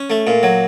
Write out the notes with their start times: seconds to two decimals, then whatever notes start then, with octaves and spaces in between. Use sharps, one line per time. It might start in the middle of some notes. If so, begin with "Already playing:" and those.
Already playing: C#4
0.10 A3
0.27 A#2
0.43 F#3